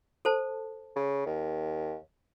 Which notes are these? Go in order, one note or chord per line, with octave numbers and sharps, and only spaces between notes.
A4 C5 A5
C#3
D#2